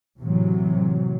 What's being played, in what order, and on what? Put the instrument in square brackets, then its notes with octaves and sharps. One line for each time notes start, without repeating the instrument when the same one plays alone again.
[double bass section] A2 C3 E3 F#3